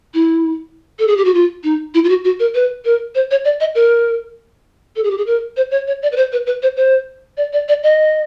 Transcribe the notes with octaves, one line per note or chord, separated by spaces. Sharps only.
E4
A4
G#4
G4
F#4
F4
D#4
E4
F4
F#4
F#4
A#4
B4
A#4
C5
C#5
D5
D#5
A#4
A4
G#4
G4
G#4
A#4
C5
C#5
C#5
D5
B4
C5
B4
B4
C5
C5
D5
D5
D5
D#5